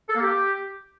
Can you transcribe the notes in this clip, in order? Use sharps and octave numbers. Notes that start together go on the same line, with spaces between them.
A4
A#3
G4